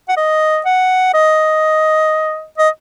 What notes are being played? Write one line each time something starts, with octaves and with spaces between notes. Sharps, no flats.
F#5
D#5
F#5
D#5
D#5